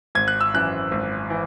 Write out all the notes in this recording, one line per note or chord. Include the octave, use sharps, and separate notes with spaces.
G#1 G#6
F#6
E6
F#2 E3 F#6
G#1
E3